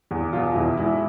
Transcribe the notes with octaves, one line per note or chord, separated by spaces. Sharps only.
E2
B2 F4
E2 E4
G#2 E4